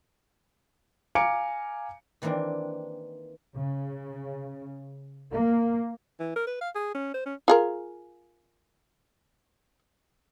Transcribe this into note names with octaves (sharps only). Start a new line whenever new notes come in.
F5 G#5 A#5 D6 C#7 D7
D#3 E3 A#3 C4 D4
C#3
A#3
E3
A#4
B4
F5
G#4
C#4
C5
C#4
F4 G#4 A#4